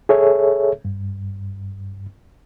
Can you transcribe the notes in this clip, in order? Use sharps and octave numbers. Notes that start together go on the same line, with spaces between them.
G#4 A4 C#5 E5
G2